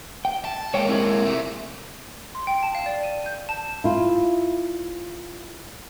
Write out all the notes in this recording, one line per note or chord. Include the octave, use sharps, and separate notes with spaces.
G5
A5
G#3 A#3 C#5 G5
C4 E4 G#4
C3 A3
C6
G5
A5
F5
D5
D#7
G6
A5
E4 F4